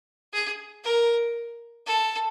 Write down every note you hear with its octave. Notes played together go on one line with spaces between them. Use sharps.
G#4
A#4
A4